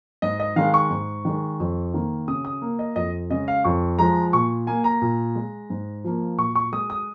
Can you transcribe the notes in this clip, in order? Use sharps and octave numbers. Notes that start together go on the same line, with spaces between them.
G#2 D#5
D#5
D#3 G#3 F5
C#6
G#2
D#3 G#3
F2
D#3 A#3
C#3 D#6
D#6
A#3
D#5
F2 D#5
C#3 G#3 D#5
F5
F2 C#6
F3 G#3 A#5
A#2 C#6
A#3 G#5
A#5
A#2
G#3
G#2
F3 A#3
A#2 C#6
C#6
G#3 D#6
D#6